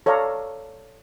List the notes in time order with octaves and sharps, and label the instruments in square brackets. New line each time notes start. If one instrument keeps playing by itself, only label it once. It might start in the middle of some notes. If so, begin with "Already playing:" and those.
[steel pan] A4 C#5 D5 F5 A#5